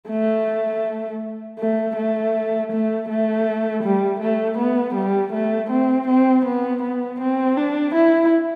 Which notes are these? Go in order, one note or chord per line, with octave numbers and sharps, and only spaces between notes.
A3
A3
A3
A3
A3
G3
A3
B3
G3
A3
C4
C4
B3
B3
C4
D4
E4